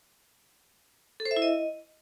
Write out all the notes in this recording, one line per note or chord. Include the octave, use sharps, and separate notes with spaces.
A4
C5
E5
E4
D#5